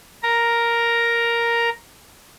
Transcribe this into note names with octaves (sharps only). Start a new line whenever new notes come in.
A#4 A#5